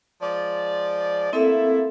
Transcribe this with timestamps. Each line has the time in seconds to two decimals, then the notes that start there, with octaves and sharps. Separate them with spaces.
0.22 F3 G#3 D5
1.33 A3 A#3 C4 E4 A4 E5